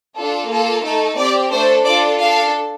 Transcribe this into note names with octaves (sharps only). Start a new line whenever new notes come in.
D4 F4 A4
A#3 F4 A4
A3 D#4 A4
C4 G4 D5
A3 D4 A4 C5
D4 F4 A4 D5
D4 A4 F5